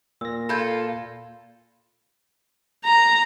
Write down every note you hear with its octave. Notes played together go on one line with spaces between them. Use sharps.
A#2 E6 A#6
F4 A4 B5 G6 G#6
A#5